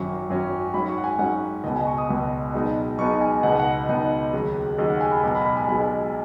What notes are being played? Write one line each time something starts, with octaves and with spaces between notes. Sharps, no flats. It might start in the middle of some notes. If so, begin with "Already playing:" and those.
Already playing: G#1 F#2 F#3 C#4 C#6
G#1 F#2 F#3 C#4
G#2 F#3 C#4 B5
C#6
F#5
G#5
G#2 F#3 C#4 F#5
C#2 B2 B3 D#5
G#5
C#6
D#6
C#2 B2 B3
B1 B2 G#3 B3 D#4
B1 B2 G#3 B3 D#4 C#6
G#5
C#2 B2 B3 D#4 F#5
D#5
F#5
C#2 B2 B3 D#4
D#2 C#3 F#3
D#2 C#3 F#3 D#5
F#5
G#5
B5
B1 B2 G#3 B3
B5
B5
G#5
B1 B2 G#3 B3 B5